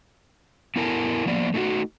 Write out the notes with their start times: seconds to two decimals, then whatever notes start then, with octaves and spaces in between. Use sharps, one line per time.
0.76 B3 E4 A4 A#4 G#5 A5
1.26 F3 A#3 B3 D5
1.54 A3 D#4 E4 F#4